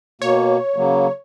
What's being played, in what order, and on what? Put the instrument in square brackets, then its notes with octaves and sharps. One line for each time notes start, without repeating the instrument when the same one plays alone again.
[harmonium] B2 A#3 [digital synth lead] C#5
[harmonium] C#3 F#3 A#3